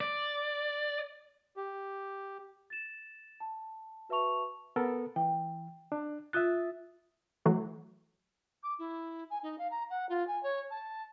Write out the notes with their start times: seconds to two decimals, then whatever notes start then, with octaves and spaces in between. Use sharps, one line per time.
0.01 D5
1.57 G4
2.70 A6 E7
3.40 A5
4.09 F#4 B4 E5 A5 C#6 F7
4.76 B3 A4 A#4
5.16 E3 G5
5.92 D4
6.33 F4 E5 D#6 F#6 A6
7.45 E3 F#3 A3
8.63 D6
8.79 E4
9.30 G#5
9.43 D#4
9.58 F5
9.71 A#5
9.90 F#5
10.09 F4
10.27 G#5
10.43 C#5
10.70 A5